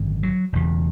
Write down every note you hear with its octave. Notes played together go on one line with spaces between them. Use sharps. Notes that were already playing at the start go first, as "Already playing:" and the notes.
Already playing: G#1 F#2 D3
F#3
E1 E2 C#3